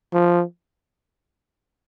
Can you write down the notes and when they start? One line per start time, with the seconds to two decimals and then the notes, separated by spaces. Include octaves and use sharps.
0.13 F3